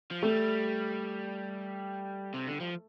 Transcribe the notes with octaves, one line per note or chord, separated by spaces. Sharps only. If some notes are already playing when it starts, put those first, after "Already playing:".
F3
G3 A3
C3
D3
F3